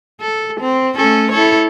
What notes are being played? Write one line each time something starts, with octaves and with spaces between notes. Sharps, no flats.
A4
C4
A3 C#4 A4
E4 A4 C#5